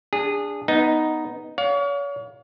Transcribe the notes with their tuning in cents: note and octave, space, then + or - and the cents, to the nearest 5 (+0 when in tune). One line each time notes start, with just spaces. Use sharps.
D4 -5 G#4 -20
B3 +0 D#4 +0
C#5 +40 F5 +30